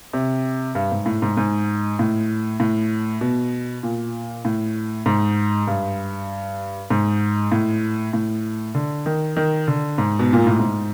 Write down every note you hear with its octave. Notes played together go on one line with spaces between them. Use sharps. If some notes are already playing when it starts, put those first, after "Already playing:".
C3
G2
G#2
A2
G#2
G#2
A2
A2
B2
A#2
A2
G#2
G2
G#2
A2
A2
D3
D#3
D#3
D3
G#2
B2
A#2
A2
G#2